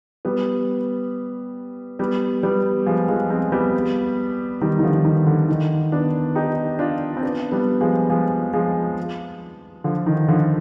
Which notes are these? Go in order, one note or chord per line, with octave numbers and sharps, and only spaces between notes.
G3 B3
G3 B3
G3 B3
F3 G#3
F3 G#3
G#3 C4
G3 B3
D#3 G3
D#3
D3 F3
D#3
D3
D#3
B3 D4
D#4 G4
D4 F4
C4
B3 D4
G3 B3
F3 G#3
F3 G#3
F3 G#3
D3 F3
D#3
D3 F3